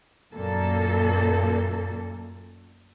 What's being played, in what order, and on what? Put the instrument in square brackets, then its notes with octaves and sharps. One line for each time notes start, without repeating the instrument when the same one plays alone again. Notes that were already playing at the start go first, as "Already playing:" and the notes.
[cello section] F#2 A#2 A#3 A4